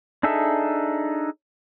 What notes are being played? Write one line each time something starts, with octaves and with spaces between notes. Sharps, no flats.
D4 D#4 G#4 A4 E5